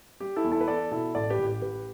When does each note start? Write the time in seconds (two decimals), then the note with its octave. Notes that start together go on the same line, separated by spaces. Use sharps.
0.20 G3 G4
0.36 E4 A4
0.44 E2
0.52 E4 A4
0.61 B4
0.68 E2 A4 D5
0.91 B2 E4 A4
1.15 A1 A4 D5
1.30 G4 B4
1.39 A1
1.47 G4
1.62 A1 G4 B4